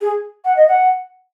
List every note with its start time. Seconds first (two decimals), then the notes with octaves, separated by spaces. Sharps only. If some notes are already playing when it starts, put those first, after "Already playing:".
0.01 G#4
0.45 F#5
0.57 D#5
0.68 F#5